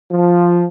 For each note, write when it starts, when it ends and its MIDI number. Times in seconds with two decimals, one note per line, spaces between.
0.12 0.63 53